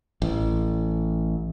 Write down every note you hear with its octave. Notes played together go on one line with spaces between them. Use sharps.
A1